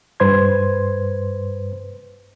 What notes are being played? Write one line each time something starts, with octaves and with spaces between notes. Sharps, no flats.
G2 B4 C5 C6 G#6